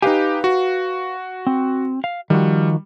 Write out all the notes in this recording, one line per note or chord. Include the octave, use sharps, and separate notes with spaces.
D#4 G4 B4 F5 G#5
F#4
C4
F5
D#3 F3 G3 F#4